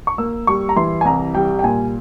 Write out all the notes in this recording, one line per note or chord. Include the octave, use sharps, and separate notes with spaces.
C#6
A#3 E6
G3 C#6
A#5
E3 C6
G#5
C2 A#5
G3 G5
G5
A#2 G#5